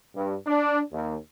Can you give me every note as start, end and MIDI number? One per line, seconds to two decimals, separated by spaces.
0.15 0.34 43
0.46 0.80 62
0.92 1.15 39